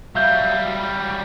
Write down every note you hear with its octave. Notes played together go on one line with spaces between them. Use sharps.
F#3 G3 E5 F5 G6